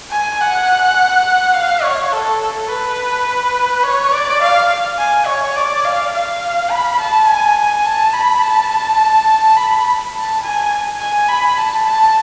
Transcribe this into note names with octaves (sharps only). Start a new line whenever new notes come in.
G#5
F#5
F5
C#5
A4
A4
B4
C#5
D5
F5
G#5
C#5
D5
F5
F5
B5
A5
G#5
A5
B5
A5
B5
A5
G#5
G#5
B5
A5
A5